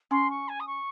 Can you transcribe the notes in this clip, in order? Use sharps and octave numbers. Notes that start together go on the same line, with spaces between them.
C#4 C6
C#6
G#5
D#6
C#6